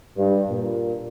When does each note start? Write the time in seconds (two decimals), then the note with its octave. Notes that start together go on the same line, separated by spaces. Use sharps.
0.17 G2
0.50 A#2